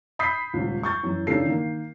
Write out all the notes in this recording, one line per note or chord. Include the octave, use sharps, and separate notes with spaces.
B5 D#6 G6 B6 C7
D#1 C#2
C#6 G6 A6
F#2 E3
C#3 E3 D4 D#4 A4 C7
D#3 A#3